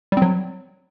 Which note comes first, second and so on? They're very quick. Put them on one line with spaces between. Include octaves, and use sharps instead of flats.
G3 C4 F#3